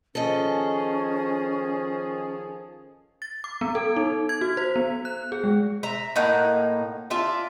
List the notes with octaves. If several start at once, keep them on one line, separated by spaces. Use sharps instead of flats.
D#3 F3 C#4 G#4 A4 D#5
A6
D6
B3
A4
D#4
G#6
F#4
C5
B3
F#6
G#4
G#3
E5 A#5
A2 A#3 D#4 F#5
D4 F4 E5